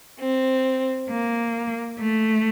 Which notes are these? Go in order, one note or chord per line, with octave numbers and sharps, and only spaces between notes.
C4
A#3
A3